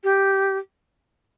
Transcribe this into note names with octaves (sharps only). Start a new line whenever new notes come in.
G4